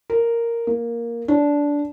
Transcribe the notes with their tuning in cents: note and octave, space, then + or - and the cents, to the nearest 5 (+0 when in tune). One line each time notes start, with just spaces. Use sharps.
A#4 -5
A#3 +5
D4 -15